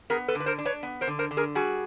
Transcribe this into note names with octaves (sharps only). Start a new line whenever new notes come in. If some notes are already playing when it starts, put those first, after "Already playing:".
B3 G#4 A#4
A4 B4
D3
B4
A#4 C5
D4
B4 C#5
B3
A#4 C5
D3
A#4 C5
D3
G#4 A#4
G3 F#4 G#4